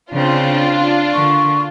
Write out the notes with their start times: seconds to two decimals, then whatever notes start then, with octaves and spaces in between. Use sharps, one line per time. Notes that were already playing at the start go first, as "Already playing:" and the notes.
0.12 C#3 C4 D4 F4
1.13 D3 A#3 C#6